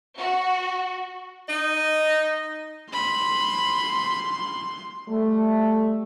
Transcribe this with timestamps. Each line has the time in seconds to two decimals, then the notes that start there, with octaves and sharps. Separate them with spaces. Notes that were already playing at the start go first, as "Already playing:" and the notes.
0.18 F#4
1.49 D#4 D#5
2.93 B5 C6
5.08 G3 A3